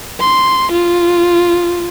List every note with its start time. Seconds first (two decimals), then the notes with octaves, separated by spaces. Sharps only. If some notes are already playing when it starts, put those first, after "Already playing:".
0.20 C6
0.72 F4